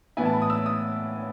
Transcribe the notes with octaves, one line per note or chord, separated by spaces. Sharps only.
A2 E3 B3 E4 G#5
A5
B5
D#6
E6
D#6